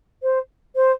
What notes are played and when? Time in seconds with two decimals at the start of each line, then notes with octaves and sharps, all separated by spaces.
0.23 C5
0.75 C5